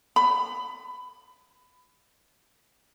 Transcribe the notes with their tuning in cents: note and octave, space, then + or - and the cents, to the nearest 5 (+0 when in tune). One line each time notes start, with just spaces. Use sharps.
B5 +20